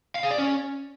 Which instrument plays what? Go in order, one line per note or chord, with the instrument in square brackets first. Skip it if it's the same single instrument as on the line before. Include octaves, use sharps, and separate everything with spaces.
[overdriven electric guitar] F5
G#4
D5
C#4